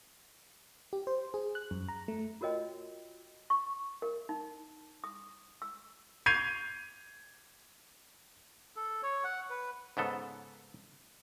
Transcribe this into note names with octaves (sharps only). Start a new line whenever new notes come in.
G4
C5
G#4
F#6
F#2
A#5
A3
F4 F#4 A#4 C#5 D#5 G5
C#6
A#4
D#4
D#6
E6
G6 G#6 C7 D#7 F7
A4
C#5
F#5
B4
G#2 C#3 B3 A4